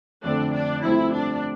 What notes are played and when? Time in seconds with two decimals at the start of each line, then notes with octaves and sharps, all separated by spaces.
0.24 F2 D3 A3 C4 D4
0.54 D4
0.83 G2 F3 A3 C4 E4
1.13 D4